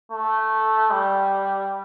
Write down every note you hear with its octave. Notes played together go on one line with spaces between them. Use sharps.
A3
G3